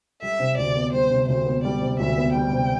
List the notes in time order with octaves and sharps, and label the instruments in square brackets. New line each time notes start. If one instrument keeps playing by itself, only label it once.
[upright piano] G3 [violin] E5
[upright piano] C3
[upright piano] D2 [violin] D5
[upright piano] B3
[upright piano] G3 [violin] C5
[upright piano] C3
[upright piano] D2 [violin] C5
[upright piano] B3
[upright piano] G3 [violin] D5
[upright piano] C3
[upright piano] D2 [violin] E5
[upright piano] B3
[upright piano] G3 [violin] G5
[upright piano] C3